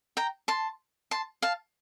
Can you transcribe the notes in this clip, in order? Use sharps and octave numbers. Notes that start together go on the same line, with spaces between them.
G5 A#5
A5 C6
A5 C6
F5 A5